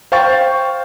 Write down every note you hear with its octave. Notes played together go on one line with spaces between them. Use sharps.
C5 F5 G5 C#6 A6